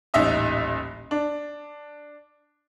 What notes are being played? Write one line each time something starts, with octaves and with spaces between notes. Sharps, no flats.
D#1 A1 D#4 D#5 E5 D#6
D4